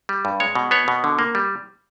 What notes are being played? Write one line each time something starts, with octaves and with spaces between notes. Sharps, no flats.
G3
G2
G#3 C#5
B2
B3 C#5
B2
D3
A#3
G3